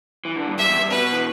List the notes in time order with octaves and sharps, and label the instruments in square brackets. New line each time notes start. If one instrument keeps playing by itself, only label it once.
[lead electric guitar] E3
D3
G2
[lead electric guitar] G2 [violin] E5
[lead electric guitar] E2
G2
[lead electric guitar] B2 [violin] B4
[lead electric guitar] E3